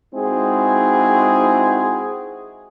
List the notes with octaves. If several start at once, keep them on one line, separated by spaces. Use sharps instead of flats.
G#3 C4 D#4 E4 F#4 G#4